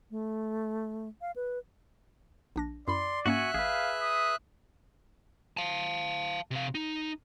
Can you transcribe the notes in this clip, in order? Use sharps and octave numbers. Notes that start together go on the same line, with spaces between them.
A3
F5
B4
A#1 D4 A#6
F#2 E4 D5 B5 C6
G#2 A#3 C#4 F#4 E5 F#5 G#5 F#6
A1 G#4 B4 F5
D#6
F5 A5
C3 F5
D#4